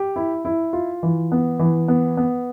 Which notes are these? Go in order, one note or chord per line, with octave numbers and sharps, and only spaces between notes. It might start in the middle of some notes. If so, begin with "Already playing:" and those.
Already playing: G4
E4
E4
F4
E3
B3
E3
B3
B3